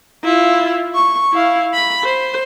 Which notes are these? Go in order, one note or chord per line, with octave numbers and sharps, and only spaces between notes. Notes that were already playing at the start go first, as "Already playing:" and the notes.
E4 F4
C#6
E4 F5
B5
C5